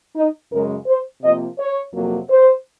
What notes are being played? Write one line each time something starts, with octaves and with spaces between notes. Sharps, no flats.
D#4
F#2 C#3 G#3 A#4
C5
C3 F3 A#3 D#5
C#5
F2 C3 F#3 A#3
C5